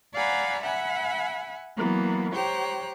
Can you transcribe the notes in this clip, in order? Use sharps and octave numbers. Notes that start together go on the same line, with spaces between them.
D5 F5 F#5 G#5 A#5 B5
E5 F#5 G#5 B5
E3 F#3 A#3 B3
G4 C5 C#5 G5 A#5 F#6